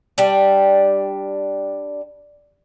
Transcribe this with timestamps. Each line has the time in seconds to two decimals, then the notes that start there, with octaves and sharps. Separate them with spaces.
0.18 G3 D4